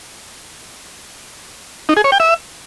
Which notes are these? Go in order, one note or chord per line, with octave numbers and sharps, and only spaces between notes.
D#4
G#4
C#5
G5
E5